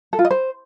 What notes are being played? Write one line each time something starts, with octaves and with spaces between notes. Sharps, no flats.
A4
F4
D#5
C5